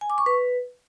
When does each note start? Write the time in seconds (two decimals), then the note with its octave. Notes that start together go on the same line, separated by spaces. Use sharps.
0.01 G#5
0.10 D6
0.18 C#6
0.26 B4